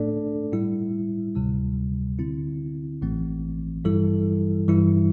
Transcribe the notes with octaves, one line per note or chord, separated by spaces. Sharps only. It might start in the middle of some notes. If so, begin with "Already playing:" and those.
Already playing: A2 A3 D4 A4 D5
A2 G3 E4
D2 C3 G3
D3 C4 E4
A1 A2 E3 A3 C4
G2 E3 G3 E4 A4
G2 E3 G3 E4